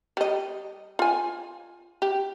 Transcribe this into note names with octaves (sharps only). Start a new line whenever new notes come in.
G3 D#5
F4 G#5
G4